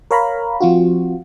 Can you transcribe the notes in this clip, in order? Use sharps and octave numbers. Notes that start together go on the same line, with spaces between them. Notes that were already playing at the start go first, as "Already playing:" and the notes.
A#4 C#5 F5 A#5 B5
F3 C4 F4 F#4